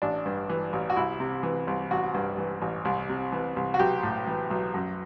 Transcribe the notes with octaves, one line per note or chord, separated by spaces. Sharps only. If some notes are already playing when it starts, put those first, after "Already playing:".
A1 D4
G2
E3
A1
F#4
C2 E4
C3
E3
C2
A1 F#4
G2
E3
A1
C2
C3
E3
C2
F#4
B1 G4
A2
E3
B1
F#2